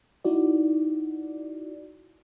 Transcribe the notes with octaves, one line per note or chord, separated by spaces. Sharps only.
D#4 E4 F#4 D5